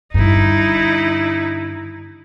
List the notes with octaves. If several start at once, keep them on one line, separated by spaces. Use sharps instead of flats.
G2 D3 D#4 E4